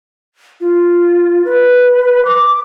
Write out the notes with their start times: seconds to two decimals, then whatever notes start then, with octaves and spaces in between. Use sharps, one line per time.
0.61 F4
1.45 B4
2.25 D6